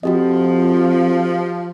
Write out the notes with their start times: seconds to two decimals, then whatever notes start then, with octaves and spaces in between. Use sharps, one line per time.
0.03 F2 F3 F#4 G4 D#5